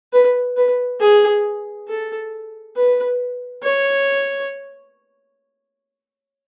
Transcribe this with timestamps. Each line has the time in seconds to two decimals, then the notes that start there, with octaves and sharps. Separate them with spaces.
0.13 B4
0.57 B4
1.00 G#4
1.88 A4
2.76 B4
3.63 C#5